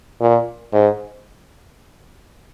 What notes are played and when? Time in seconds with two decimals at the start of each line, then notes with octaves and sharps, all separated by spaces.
0.21 A#2
0.73 G#2